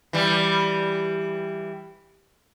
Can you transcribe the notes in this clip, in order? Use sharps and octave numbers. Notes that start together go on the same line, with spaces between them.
E3 G3